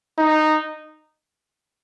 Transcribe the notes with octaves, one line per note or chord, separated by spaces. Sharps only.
D#4